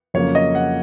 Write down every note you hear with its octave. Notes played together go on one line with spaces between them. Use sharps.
F2 C#3 F#3 A#3 C#5
D#5
F#5